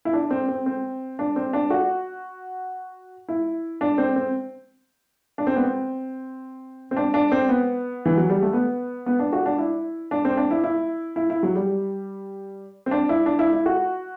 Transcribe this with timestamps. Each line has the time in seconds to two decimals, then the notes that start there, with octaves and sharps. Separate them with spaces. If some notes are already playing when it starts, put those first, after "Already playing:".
0.05 E4
0.13 D4
0.31 C4
0.48 C4
0.66 C4
1.19 D4
1.36 C4
1.53 D4
1.70 F#4
3.29 E4
3.81 D4
3.98 C4
4.16 C4
5.38 D4
5.47 C4
5.55 B3
5.64 C4
6.91 C4
6.97 D4
7.14 D4
7.32 C4
7.49 B3
8.05 E3
8.17 F#3
8.30 G3
8.42 A3
8.53 B3
9.06 B3
9.19 D4
9.33 F#4
9.46 D4
9.58 E4
10.11 D4
10.25 C4
10.37 D4
10.51 E4
10.64 E4
11.16 E4
11.30 E4
11.43 F#3
11.56 G3
12.86 C4
12.91 D4
13.09 E4
13.26 D4
13.39 E4
13.53 E4
13.66 F#4